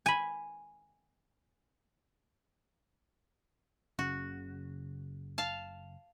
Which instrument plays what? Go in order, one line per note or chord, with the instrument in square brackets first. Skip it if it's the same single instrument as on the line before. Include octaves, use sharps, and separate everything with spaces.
[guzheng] G#5 B5
[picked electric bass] F#1 C#3 C#4 [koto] F#4
[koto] F5 A5